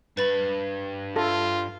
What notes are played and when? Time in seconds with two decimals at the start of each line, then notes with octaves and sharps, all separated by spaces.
0.17 G2 B4 B5 A6
1.16 F4 A4